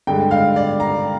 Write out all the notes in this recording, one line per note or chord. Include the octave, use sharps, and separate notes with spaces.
G2 D3 G#3 G5
F5
D5
A#5